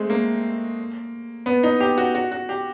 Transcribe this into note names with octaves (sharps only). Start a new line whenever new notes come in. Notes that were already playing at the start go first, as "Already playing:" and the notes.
Already playing: G#3 A3 C4
A#3
B3
D#4
G4
F#4
F#4
F#4
G4